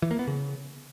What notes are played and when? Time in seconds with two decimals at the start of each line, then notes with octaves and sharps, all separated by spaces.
0.02 E3
0.11 A#3
0.19 B3
0.27 C#3